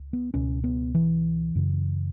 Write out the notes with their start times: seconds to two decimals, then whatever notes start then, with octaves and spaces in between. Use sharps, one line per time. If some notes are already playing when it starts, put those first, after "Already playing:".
Already playing: C#2
0.13 B3
0.34 C#2 B2 C#4
0.64 B3
0.95 E3
1.55 F#2 C#3